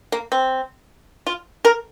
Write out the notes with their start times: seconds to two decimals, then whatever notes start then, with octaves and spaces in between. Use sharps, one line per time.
0.12 A#3
0.32 C4
1.27 F4
1.65 A#4